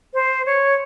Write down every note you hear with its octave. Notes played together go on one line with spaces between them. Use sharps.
C5
C#5